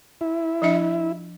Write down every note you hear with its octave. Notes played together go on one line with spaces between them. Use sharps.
E4
F3 D4 E5